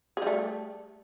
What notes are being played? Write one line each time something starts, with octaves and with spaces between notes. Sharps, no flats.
G3 A3 G#4